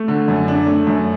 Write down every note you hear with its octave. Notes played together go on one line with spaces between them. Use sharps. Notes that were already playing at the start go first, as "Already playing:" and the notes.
Already playing: A3
D3
F#2
D4
A3
F#2